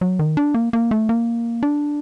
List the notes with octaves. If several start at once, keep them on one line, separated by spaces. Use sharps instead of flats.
F#3
D#3
D4
A#3
A#3
A3
A#3
D4